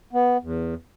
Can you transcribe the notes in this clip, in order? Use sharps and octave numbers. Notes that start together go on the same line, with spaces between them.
B3
E2